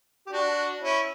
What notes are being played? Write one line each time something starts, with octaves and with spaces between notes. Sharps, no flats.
G4
D4 F#4
C#4 E4